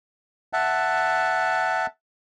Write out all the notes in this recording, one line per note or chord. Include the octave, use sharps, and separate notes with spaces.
E5 F#5 A5